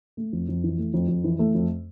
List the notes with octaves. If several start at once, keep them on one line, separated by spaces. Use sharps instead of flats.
A3
F2
F2
E3
A3
F2
F2
E3
A3
F2